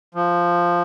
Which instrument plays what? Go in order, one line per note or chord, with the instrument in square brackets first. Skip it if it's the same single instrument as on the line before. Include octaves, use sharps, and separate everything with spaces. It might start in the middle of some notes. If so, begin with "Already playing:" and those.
[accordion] F3